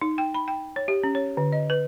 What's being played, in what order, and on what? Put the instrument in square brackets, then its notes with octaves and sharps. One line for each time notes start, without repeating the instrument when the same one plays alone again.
[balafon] D#4
G5
B5
G5
C#5
G4
C#4
C#5
D3
D#5
B4